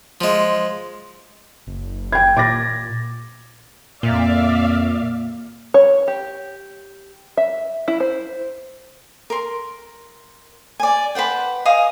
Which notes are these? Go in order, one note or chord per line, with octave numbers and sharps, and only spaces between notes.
F3 G#3
F#1
G5 G#6
A#2 D6 A6 A#6
F2 A#2 A#3 D5 E5 F5
C#5
G4
E5
E4
C5
A#4 C6
D5 G#5
B4 C5 F#5 G5
D#5 F5 G#5 D#6